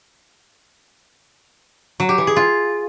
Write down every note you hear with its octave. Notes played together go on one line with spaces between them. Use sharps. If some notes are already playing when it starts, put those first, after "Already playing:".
F#3
G4
E3
G#4
F4